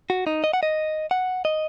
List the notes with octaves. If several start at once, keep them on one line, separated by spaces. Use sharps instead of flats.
F#4
D#4
D#5
F#5
D#5
F#5
D#5